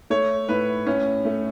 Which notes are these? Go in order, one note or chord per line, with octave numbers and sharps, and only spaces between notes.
A3 C#5
A2 B4
A2 C#4
A3